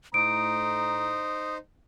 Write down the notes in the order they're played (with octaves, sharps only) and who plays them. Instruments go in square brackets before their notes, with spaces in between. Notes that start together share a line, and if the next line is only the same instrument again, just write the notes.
[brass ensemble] A2 A3 A#5 [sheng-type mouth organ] D#4 C5 [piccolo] D#6 [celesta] D7